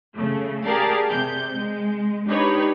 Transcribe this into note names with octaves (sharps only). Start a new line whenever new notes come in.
C#3 A3
G4 G#4 A#4 D5 F5 A5
C3 G6
G#3
D4 D#4 G4 B4 C#5